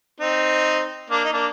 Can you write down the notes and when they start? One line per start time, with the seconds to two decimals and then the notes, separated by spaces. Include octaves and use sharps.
0.20 C4 D#4
1.10 A#3 D4
1.25 D#4
1.32 A#3 D4